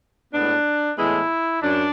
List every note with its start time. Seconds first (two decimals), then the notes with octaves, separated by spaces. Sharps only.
0.33 A2 G#3 B3 D4
0.98 A2 E3 G#3 B3 E4
1.62 F#2 D4